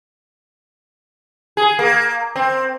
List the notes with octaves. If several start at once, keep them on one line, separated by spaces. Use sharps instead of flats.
G#4
A#3
C4